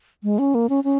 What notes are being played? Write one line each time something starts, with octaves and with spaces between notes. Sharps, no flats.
G#3
C#4
A#3
C#4
C#4